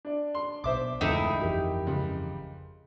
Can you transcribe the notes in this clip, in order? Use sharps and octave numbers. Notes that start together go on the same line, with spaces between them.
D4 D5
C6
B1 B2 C5 E5 D6
E1 C#2 G2 E3 A3 D#4 E4 G5
G1 F2 E3 G4 A#4
C#2